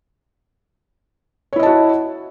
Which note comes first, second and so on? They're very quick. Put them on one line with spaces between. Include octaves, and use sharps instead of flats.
C#5 E4 D#5 A5 F#4